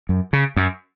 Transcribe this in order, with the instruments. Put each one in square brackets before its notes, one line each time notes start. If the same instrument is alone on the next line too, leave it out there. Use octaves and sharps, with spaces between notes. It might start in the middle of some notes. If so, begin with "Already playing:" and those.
[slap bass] F#2
C#3
F#2